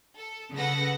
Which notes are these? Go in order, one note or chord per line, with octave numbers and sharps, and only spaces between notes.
A4
C#3 A4 B4 F#5 A#6